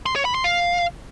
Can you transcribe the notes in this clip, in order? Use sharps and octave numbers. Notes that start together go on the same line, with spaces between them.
C6
C#5
B5
C6
F5